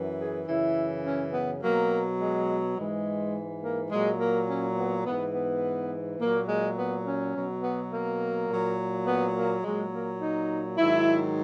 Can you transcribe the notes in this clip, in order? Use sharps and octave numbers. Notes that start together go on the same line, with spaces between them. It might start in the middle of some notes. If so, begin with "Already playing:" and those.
Already playing: F#2 E3
G#4
F#2 C#3 E3 E4
C#4
B3
B2 F#3 A#3
G#3
G#2 E3 G#3
A#3
A#2 F#3 G#3
A#3
C#4
B3
G#2 E3 B3
B3
A#2 F#3 A#3
G#3
B3
C#4
B2 F#3
B3
A#3
A#2 F#3
B3
A#3
A#2 F#3 G#3
A#3
D#4
G#2 D#3 F#3 E4